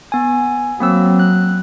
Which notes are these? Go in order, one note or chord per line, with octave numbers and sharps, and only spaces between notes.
B3 G#5
F#3 A#3 C4 E6
F#6